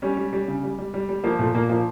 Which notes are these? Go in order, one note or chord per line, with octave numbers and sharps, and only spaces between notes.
G3 C#4
G3
G3
C#3
G3
G3
G3
G3
F3 A#3
A#2 A3
A#2 A#3
F3 A#3